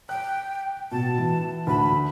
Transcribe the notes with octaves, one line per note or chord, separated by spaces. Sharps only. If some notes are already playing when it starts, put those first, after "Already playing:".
G5 F#6
B2 A5
E3
D2 B5